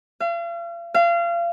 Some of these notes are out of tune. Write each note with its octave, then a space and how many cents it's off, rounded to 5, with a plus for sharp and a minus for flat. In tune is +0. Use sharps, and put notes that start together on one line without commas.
F5 -40
F5 -30